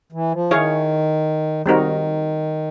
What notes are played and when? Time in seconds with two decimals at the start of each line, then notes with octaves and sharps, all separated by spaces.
0.12 E3
0.32 F3
0.51 D#3 E4 G#4 C#5 F5
1.66 D#3 G3 C4 D#4 F#4 A#4